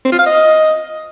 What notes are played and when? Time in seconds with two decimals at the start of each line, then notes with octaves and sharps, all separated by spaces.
0.05 C4
0.12 F4
0.19 F5
0.26 D#5